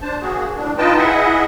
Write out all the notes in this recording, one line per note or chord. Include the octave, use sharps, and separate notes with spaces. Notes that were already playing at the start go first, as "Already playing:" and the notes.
D4 C5 A5
A#3 F#4 G#4
A2 D4
D#4 F4 B4 D#5 G5 A5
E4 G#4 D#5 E5 F#5